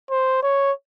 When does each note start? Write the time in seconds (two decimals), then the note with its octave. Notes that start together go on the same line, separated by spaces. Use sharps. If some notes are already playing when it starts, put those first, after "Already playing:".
0.10 C5
0.43 C#5